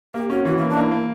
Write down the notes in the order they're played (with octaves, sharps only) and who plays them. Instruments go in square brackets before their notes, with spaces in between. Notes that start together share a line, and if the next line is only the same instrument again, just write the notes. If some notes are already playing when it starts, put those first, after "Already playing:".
[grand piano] A#3 [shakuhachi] G4
[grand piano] C#4 [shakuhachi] F#4
[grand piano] E3 [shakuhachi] F#4
[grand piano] A#3 [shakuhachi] E4
[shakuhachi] D4
[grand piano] A#3 [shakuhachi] E4
[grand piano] A#3